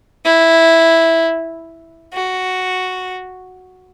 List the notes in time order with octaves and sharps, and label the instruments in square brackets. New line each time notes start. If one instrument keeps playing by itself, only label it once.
[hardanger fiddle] E4
F#4